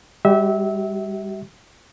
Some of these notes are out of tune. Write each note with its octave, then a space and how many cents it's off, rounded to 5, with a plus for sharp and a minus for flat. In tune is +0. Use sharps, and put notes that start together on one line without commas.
G3 +30 G4 -45 E5 -25